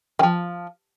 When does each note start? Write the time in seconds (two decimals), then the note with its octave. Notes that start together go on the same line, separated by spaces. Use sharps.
0.19 D#3 F3